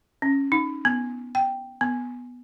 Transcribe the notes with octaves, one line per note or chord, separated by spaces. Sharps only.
C#4
D#4
B3
G5
B3